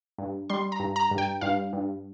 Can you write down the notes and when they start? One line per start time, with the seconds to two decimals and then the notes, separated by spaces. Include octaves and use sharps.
0.18 G2
0.50 G3 C6
0.72 A#5
0.80 G2
0.96 A#5
1.11 G2
1.18 G5
1.41 G2 F5
1.73 G2